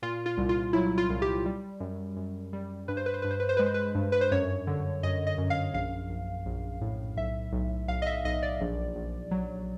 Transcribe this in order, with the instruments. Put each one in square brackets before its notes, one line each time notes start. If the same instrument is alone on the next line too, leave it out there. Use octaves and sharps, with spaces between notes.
[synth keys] A#2 F4
F4
C2
F4
F#3 E4
F4
C2
G4
G3
F#2
F#2
G3
G2 B4
C5
B4
C5
G2 B4
C5
B4
C5
G#3 B4
C5
B4
G2
B4
C5
F#2 C#5
D3
F#2 D#5
D#5
F#2
F5
A#1 F5
A#1
A#1
A2
B1 E5
B1
B1 F5
D#5
E5
B1 D#5
D5
A#1
A#1
F#3